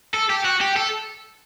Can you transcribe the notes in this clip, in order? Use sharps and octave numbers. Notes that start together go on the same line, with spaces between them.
A4
G4
F#4
G4
A4